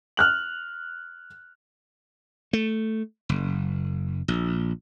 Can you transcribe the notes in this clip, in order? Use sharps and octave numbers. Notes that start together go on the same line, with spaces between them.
F6 F#6 F#7
A3
F#1
A#1